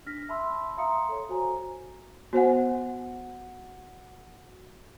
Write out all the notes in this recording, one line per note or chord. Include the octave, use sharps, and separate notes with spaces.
D4 F6 A#6 B6
E5 A5 B5 C6 E6
E5 F5 A#5 C6 D#6 C#7
A4 C#5
F#4 C5 G#5 A#5
B3 F#4 C5 F#5 G#5